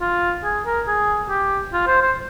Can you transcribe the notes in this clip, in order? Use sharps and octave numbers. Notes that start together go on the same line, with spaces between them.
F4
G#4
A#4
G#4
G4
F4
C5
C5